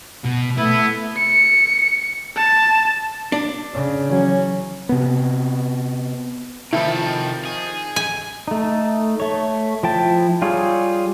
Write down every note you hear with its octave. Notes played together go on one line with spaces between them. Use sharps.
B2
A3 B3 E4
C#7
A5
D4
C#3
E3 F#3 C#4
C3 B3
C3 D#3 F3 E4 A4
G#4
G#5
A3 D#4
A3 C#5
F3 E4 G5 A5
G3 F4 G#4 C#5